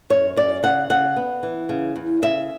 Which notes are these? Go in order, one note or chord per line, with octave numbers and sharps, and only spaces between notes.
F#2 C#5
F#2 D5
C#3 F#5
C#3 F#5
B3
E3
C#3
E2
C#3 E5